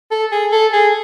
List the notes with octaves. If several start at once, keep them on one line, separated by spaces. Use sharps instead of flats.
A4
G#4
A4
G#4